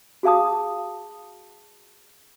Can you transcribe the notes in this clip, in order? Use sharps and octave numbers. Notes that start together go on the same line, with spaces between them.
F#4 G#4 F5 A5 D#6